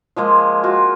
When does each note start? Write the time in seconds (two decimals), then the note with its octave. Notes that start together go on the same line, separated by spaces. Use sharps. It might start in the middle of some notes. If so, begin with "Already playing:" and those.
0.16 F3 G#3 A#3
0.63 F4 F#4